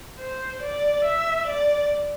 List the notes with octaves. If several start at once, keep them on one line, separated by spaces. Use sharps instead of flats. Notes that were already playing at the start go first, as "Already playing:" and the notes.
C5
D5
E5
D5